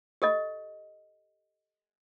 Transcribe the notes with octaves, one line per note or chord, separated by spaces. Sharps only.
G4 A4 D#5